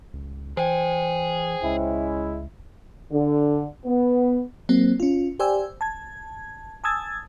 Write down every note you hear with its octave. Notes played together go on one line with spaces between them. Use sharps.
C#2
E3 G#4 C5 G5 G#5
C#2 G#3 C#4 E4
D3
B3
F#3 A#3 C4
C#4 F4
G4 C5 D5 G5 G#5 E6
A5 G#6
G#5 A5 D#6 E6 G#6 A6